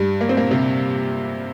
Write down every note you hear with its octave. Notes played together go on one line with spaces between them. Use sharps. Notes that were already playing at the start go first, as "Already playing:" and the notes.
Already playing: G2 G3
A#3
C4
A#2 A#3
C3 C4